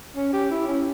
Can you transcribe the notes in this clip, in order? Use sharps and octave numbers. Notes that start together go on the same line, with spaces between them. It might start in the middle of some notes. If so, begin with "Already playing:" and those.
C#4
G4
E4
C#4